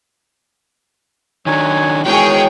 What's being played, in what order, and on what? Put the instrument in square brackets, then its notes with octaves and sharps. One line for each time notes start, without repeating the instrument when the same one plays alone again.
[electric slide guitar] D#3 D4 [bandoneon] F#3 C#5 G#5
[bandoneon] D#3 [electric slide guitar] G#3 E4 F#4 [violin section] G#4 C#5 G5